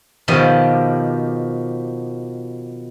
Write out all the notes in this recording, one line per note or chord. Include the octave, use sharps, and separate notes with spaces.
B2 D#3 F3 G4 D#5